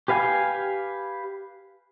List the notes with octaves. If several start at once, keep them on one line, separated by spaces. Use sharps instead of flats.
G4 B4 F5 G#5